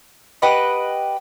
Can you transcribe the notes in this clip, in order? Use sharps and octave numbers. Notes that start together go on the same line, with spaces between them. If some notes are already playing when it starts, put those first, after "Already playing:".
G4 B4 D#5 F#5